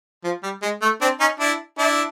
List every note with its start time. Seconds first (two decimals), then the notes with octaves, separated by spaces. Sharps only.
0.24 F3
0.43 G3
0.62 G#3
0.82 A3
1.01 C4 D4
1.20 C#4 D#4
1.40 D4 E4
1.78 D4 E4